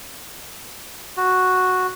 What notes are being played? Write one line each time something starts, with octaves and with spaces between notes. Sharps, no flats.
F#4